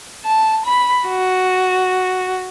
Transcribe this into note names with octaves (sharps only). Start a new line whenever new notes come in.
A5
B5
F#4